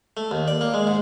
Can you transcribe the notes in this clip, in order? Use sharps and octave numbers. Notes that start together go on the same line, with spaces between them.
A3
D#2
D5
A#3
G#3
G#2